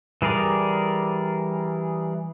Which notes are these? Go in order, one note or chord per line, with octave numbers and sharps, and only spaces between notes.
E3 G3 G#4 A#4 D5